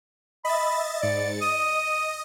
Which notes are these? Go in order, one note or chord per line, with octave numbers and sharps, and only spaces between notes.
D#5 E5 B5 A6
G#2 D5 A6 C#7
D#5 D#6